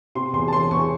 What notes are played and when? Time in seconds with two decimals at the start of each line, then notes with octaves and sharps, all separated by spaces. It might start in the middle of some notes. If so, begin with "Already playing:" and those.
0.15 C3 C6
0.33 E2 C6
0.48 A5
0.53 E1 C6
0.71 E2 C#6